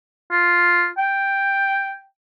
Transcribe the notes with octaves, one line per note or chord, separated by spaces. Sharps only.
F4
G5